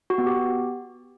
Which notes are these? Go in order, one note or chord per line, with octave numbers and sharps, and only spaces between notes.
F#4
B3
G4